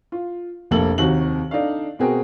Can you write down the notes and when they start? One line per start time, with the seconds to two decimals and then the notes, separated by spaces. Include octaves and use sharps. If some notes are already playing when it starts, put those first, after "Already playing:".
0.12 F4
0.71 F1 A#1 A#3 A4 F#7
0.98 D#2 C3 D#3 F#4 F#7
1.51 D4 D#4 A4 D5 F5
1.99 B2 C4 F#4 G#4 A#4 G5